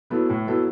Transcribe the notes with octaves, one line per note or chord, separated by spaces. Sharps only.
F#3 B3 E4 A4
A2
F#3 B3 E4 A4